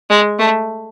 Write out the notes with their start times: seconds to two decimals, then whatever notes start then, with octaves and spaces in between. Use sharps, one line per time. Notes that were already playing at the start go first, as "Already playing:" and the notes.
0.10 G#3
0.39 A3